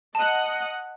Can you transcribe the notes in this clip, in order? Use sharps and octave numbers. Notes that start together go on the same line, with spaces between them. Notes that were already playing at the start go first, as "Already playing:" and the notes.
D#5 F#5 A5